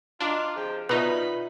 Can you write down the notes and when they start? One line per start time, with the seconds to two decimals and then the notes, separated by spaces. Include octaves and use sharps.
0.20 D4 F4 D#5 A#5 C6
0.56 C3 F3 G#4 G5
0.89 B2 D#3 D#4 F4 B4 D5 E5 B5